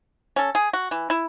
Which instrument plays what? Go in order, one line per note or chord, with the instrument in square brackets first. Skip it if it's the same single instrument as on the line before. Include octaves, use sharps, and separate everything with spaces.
[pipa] C#4 A4
G#4
F#4
E3
E4